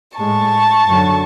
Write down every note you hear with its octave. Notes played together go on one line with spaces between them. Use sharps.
A2 G#3 A5 C#6
F#2 D3 F#3